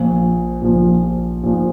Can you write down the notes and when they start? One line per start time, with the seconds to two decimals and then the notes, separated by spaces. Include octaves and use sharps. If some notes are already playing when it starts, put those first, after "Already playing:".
Already playing: A#1 A#2 F3
0.62 A#1 A#2 F3
1.44 A#1 A#2 F3